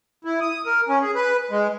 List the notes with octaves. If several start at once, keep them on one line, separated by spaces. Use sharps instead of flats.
E4
D#6
A#4
C#4
G#4
B4
G#3